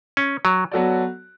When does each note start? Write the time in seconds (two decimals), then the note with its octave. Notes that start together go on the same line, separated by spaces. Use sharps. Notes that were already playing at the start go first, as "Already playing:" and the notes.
0.17 C#4
0.45 F#3
0.72 F#3 B3 F#4 A4 D5